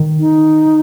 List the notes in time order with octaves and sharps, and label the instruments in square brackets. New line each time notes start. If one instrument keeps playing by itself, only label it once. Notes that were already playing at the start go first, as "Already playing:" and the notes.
Already playing: [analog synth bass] D#3
[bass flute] D#4